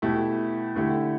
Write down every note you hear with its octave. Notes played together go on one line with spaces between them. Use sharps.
B2 A3 E4 G4
D3 A3 E4 G4